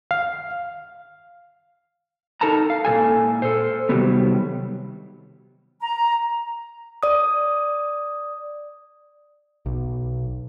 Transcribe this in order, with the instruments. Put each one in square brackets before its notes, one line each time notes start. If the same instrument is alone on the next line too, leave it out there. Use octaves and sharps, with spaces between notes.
[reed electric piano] F5
[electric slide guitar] D#4 A4 A#4 A5 A#5
F5
A#2 D#3 A4 G#5
A4 C5
C3 D#3 F#3 G3 B3
[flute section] A#5
[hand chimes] D5 D#6
[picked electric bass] B1